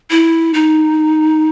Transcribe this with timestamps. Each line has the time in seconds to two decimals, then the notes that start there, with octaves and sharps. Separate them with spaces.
0.10 E4
0.54 D#4